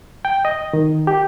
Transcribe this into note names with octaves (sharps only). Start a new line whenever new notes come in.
G5
D#5
D#3
G4